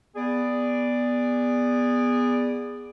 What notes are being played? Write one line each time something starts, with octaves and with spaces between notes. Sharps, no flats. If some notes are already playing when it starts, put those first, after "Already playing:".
B3 G#4 D5